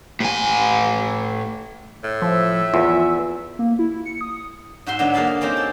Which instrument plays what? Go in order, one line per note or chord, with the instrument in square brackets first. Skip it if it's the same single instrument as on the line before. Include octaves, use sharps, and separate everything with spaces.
[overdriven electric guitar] A2 G#5
[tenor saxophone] A2
[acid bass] F3 [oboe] E5
[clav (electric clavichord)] E2 [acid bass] F4
[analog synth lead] A#3
E4
C#7
D#6
[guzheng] G#2 F#4 E5 C6
D3 F#3 G#3 B3
A#3 G#4 F5 A5 B5
F5
A#3 C4 C#4 D#4 G4
A4